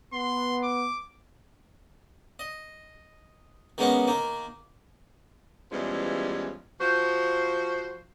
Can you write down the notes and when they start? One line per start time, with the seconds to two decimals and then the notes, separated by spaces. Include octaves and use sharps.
0.13 B3 C6
0.64 D6
2.39 D#5
3.78 D#3 G#3 A#3 B3 C#4
4.08 D#3 A#3
5.72 E2 E3 F3 G3 G#3 C#4
6.80 F3 F#4 C5